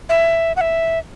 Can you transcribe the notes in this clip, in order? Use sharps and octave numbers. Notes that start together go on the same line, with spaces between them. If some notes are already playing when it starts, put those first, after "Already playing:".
E5
F#5
E5